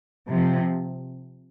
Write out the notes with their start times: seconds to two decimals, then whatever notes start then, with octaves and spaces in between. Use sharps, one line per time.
0.27 C3 F3